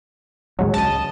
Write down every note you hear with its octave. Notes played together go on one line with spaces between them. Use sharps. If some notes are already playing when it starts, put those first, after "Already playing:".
A1 D#2 D3 F#3 G#3
C#2 D#5 A5